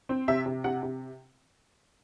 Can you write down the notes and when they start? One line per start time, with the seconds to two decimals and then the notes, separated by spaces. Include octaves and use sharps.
0.09 C4
0.28 C3 E5
0.46 C3
0.64 C3 F#5
0.83 C3